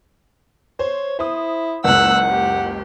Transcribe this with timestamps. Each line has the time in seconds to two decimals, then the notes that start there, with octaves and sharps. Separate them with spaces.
0.79 C5 C#5
1.19 E4 C5 D#6
1.84 F#1 C#2 F#5 E6 F#6
2.30 G4